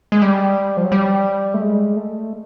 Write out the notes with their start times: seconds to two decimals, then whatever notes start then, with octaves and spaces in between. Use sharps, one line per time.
0.12 G#3
0.22 G3
0.77 F3
0.84 F#3
0.92 G3
1.54 A3
1.62 G#3
1.96 A3